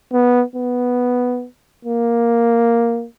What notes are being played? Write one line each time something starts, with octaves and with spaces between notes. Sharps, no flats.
B3
B3
A#3